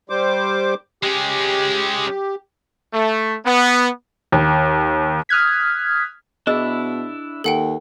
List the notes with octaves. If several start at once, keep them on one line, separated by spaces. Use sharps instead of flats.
G3 C5 D6
G#3 C#4 G4
A3
B3
D#2
D#6 F6 F#6 G#6 B6
B2 D4 E4 G#4 D#5 E6
D#2 A4 F#5 G5